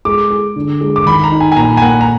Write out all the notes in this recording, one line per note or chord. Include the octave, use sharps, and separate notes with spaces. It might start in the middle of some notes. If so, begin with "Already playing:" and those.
G#3 D6
G#4
D3
G#3
D6
D#3 B5
A#5
D#4
G#5
G#5
A#2 A#5
G#5
A#3 F#5
A#5